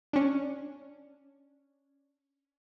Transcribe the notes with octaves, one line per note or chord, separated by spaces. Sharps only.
C#4 D4